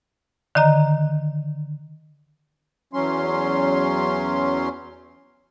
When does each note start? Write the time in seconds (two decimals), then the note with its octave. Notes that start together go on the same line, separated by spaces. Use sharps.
0.55 D3 D#3 D#5 A#5
2.93 E2 F#3 C#4 C6